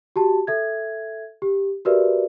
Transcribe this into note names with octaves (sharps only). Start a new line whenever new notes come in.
F#4 G4 A5
A4 E5 G#6
G4
F#4 G4 A#4 B4 D5 E5